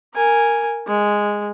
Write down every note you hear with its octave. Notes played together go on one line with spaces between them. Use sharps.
A#4 G#5
G#3